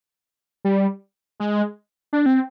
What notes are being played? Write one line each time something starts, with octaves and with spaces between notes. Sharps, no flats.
G3
G#3
D4
C4